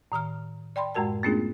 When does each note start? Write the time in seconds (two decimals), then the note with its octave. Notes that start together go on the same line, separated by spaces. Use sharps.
0.12 A2 D#3 A#5 F6
0.76 D5 G5 B5 C6
0.95 F#2 A2 G#3 F#4 A#4 A5
1.23 A3 B3 C#4 D4 F4 G#4